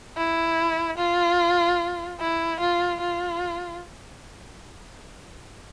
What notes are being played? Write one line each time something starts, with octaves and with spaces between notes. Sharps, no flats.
E4
F4
E4
F4
F4